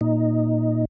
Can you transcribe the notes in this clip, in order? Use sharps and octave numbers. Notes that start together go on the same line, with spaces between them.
A#2 D#4